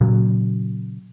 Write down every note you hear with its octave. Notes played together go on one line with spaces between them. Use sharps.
A#2 C#3 F#3